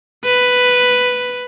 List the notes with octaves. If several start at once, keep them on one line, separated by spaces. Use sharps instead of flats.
B4